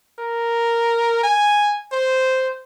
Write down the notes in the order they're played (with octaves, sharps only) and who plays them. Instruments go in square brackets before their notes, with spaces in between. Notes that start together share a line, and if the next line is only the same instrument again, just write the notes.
[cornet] A#4
G#5
C5